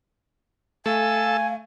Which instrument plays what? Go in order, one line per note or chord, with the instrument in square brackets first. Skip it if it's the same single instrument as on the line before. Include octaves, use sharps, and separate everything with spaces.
[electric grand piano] A3 [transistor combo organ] A4 E6 [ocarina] F5 [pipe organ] G#5